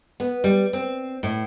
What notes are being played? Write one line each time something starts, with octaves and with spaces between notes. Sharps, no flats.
B3
G3
C4
A2